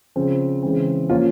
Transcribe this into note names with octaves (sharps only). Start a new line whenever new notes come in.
C#3 F3 C4
C#3 E3 G#3 C4
F3 A#3 C#4 F4